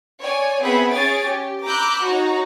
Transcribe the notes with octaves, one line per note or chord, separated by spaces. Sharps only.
C#5 D5 G#5
B3 C4 G#4 E5 F#5 B5
C#4 G#4 C#5 G#5 A6 D7
G4
A#5 B5 D6 E6 F#6 G6
D#4 F#4 C#5 A#5